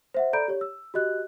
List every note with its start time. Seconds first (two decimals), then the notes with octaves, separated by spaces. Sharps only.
0.14 C5 E5 F#5
0.33 A4 D5 A#5 B5 G6 D7
0.48 G4 C#5
0.61 E6
0.94 F#4 G4 D#5 F#6